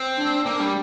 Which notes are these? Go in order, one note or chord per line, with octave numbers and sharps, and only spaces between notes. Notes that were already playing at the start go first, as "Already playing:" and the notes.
Already playing: C4
D4
A#3 D4
G3